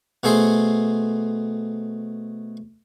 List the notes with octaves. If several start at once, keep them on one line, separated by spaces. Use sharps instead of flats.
B2 A3 G#4 A4 C5